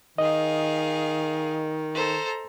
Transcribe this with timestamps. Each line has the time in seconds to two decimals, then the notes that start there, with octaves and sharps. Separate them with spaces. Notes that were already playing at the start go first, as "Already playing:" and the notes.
0.18 D#3 G#4 D#5 F5
1.94 A4 C5 A#5